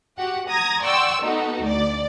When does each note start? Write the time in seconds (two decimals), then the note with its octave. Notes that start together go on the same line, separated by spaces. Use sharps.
0.18 F#4 G4 F#5
0.48 A#5 D#6 G#6 A#6
0.83 D5 F#5 G5 C6 C#6 E6
1.23 B3 D#4 F#4 A4
1.62 D2 D5